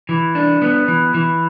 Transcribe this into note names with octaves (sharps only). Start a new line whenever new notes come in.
E3
D4
B3
E3
E3